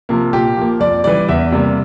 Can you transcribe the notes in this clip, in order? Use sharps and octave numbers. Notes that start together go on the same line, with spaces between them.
C3 F3 A#3
A#2 G4
F3 A#3
F2 D5
E3 G3 D5
E2 E5
C3 G3 A#3